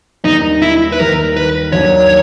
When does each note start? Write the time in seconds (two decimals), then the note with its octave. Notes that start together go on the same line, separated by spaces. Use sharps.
0.24 D#2 D#3 G3 D#4
0.62 E4
0.92 B4
0.99 D#2 D#3 G3 A#4
1.36 B4
1.72 D#2 D#3 F#3 A#3 D4 C#5